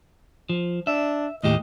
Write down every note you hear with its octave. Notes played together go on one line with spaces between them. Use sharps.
F3
D4 E5
D#2 A2 G4 D#5